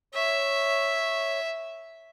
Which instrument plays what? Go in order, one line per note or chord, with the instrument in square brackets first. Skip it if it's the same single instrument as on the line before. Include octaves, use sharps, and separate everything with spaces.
[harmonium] C#5 [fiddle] E5